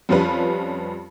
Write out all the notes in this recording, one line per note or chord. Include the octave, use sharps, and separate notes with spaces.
F2 F3 G3 C#4 F4 B4